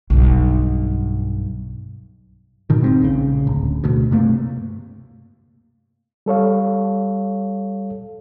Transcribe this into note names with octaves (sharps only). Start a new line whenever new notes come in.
B1 G2
G#2 B2 D#3
D#1 G#1 G#2 C4
A#1 C#3
D1
D2 B2
G2 C3 A3 A#3
G3 A4 C#5 F5